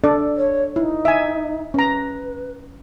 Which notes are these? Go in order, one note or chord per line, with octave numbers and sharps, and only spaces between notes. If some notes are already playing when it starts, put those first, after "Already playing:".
D4 A4 D5
C#5
D#4 E4
E5 G#5
C#4 B4 A#5